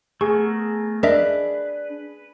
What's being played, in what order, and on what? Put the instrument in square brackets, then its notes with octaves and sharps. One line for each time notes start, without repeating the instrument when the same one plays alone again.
[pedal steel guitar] A3 B3 A#4 [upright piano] G#4 [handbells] C#6
[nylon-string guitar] D4 [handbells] A#4 D#5 E5 [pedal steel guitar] B4